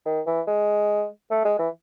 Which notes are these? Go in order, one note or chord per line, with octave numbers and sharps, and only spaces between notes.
D#3
E3
G#3
A3
G#3
E3